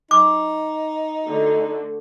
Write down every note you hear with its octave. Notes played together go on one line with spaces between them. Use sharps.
D#4 D6
D3 A3 F#4